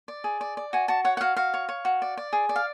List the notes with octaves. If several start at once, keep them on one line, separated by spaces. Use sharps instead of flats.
D5
G#4
D5
D5
F#4 G#5
F#4 A5
C#5 F#5
F#5
F#4 F5
F#4 F5
C#5
C#5
F#4
D5
D5
G#4
D5
F5